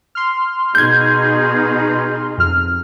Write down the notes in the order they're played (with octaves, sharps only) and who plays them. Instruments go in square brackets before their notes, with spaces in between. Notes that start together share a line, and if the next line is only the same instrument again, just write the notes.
[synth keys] C6 F6
[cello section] B2 D#4 G#4 [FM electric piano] G6 G#6
[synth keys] F2 F6